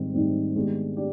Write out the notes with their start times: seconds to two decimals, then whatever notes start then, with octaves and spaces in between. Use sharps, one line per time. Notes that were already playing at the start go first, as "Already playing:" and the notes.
Already playing: G#2 D#3 G3 C4
0.14 G#2 D#3 G3 C4
0.55 D#3 G#3 B3 D4 G4
0.97 D4 G4